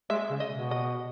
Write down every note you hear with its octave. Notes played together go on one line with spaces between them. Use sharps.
G#3 E5
C#3
D#5
B2
D#5